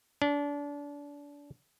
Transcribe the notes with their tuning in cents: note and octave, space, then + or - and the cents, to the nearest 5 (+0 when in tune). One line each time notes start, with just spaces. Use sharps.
D4 -30